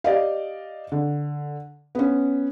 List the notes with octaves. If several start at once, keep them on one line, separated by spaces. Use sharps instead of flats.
G4 D5 D#5 F5
D3
B3 C#4